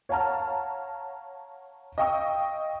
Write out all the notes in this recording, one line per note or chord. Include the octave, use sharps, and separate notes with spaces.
C#5 F5 F#5 A5 A#5 F6
D#5 F5 G5 C#6 D#6 E6